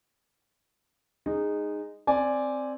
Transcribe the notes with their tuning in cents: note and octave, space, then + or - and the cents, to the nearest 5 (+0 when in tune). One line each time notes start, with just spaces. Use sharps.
G#3 -10 D#4 -15
C4 +0 D5 +0 G#5 +0